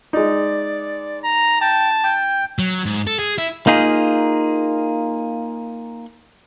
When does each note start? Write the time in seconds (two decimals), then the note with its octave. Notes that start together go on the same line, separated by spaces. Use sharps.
0.13 G#3 D#4 D5
1.24 A#5
1.61 G5 A5
2.03 G5
2.59 F#3
2.85 G#2
3.07 A4
3.19 G#4
3.38 E4
3.67 A#3 D#4 F4 G#4